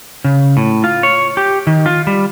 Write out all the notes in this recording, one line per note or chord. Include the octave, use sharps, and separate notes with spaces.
C#3
A2
F4
C#5
G4
D#3
F4
G3